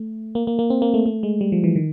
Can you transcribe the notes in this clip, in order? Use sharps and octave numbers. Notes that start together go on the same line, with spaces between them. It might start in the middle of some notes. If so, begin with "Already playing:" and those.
Already playing: A3
A#3
A#3
A#3
C4
A#3
A3
A3
G#3
G3
F3
E3
D#3